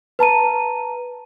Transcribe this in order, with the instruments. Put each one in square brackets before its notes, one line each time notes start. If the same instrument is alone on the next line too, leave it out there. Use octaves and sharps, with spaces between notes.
[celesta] B4 A5 A#5 D#7